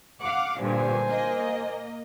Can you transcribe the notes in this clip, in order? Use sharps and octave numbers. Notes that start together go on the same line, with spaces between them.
F5 F#5 D6
G2 A#2 D3 C5 G#5
A#3 D#5